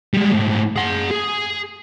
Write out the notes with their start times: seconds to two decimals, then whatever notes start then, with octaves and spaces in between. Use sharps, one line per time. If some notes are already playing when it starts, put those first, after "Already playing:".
0.14 G3 G#3
0.32 G#2 A3
0.76 G#4 F#5
1.11 G#4